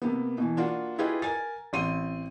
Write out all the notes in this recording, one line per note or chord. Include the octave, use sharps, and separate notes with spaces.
C3 A#3 B3
B2 E3
A#3 D4 F4 F#4
E4 F4 G4 G#4 B4 D#5
A#4 G#5 A6
A1 C4 C6 D#7